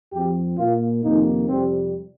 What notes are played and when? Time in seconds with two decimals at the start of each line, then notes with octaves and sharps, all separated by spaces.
0.13 F2 F3 C4 G4
0.58 A#2 A#3 F4
1.04 F2 C3 D#3 A#3 D#4
1.49 F2 C3 G3 C4